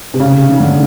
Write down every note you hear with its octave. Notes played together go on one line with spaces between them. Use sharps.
C3
C#3
D#3
D3